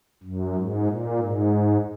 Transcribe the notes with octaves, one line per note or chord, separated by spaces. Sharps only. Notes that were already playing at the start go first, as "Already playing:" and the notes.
F#2
G#2
A#2
G#2